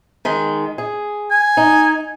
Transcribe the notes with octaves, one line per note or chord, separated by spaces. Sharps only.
D#3 G#3
G#4
G#5
D#4